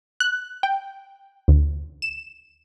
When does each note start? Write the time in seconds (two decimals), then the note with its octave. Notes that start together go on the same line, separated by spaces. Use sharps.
0.20 F#6
0.63 G5
1.48 D2
2.02 E7